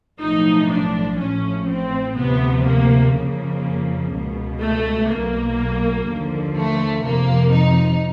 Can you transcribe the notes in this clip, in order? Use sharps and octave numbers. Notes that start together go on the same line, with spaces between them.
B1 A2 F3 D#4
D4
A1 A2 F3 C#4
C4
D2 C3 F3 B3
A#3
F2 C#3 F3 A#3
C#2 B2
A3
B1 B2 A#3
D#2 D3 F3
A3
F2 C3 F3 A#3
D#4